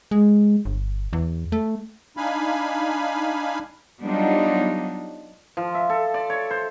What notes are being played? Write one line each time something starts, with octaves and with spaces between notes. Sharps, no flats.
G#3
G1
E2
A3
D4 D#4 F5 G#5 B5
F#3 G3 B3 D4 D#4 F4
F3
E5
A4
D5
C#5
C5